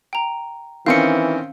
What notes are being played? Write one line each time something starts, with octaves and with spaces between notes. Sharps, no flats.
G5 A#5
D#3 E3 C4 C#4 F5 C#7